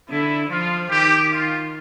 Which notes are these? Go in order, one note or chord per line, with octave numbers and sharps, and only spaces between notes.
D3 E4
F3 F4
D#3 G4
F4